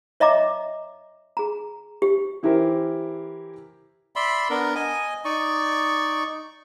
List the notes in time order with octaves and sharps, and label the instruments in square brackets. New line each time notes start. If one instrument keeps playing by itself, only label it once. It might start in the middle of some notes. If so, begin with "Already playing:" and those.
[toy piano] C#5 D#5 E5 A#5 D6
G#4 A#5
G4
[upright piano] E3 E4 G4 A#4 C5
[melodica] D5 E5 B5 C6
B3 D4 A#4
D#5 G#5
D#4 D5 C#6